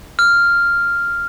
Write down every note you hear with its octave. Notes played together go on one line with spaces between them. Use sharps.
F6